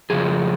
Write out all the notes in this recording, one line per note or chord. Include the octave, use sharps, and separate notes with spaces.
F2 C#3 F3 G#4